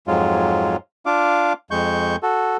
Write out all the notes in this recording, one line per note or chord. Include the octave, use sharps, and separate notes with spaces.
F2 G#2 F#3 G#3 F4
D4 F4 F5 D6
F2 G#3 C#6 G6
F#4 A4